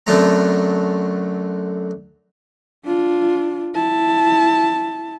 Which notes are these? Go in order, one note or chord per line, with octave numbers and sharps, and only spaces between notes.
F#2 D3 F#3 A3 C4 A#5
D4 F4
E4 A5